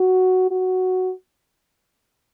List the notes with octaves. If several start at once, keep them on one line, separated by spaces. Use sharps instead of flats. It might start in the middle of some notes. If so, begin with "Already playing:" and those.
Already playing: F#4
F#4